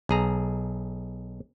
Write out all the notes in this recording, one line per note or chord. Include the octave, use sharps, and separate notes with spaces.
B1 G#4 A#5